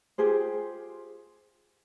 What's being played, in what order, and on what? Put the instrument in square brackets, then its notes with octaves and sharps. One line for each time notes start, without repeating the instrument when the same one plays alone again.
[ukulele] F4 G4 G#4 C5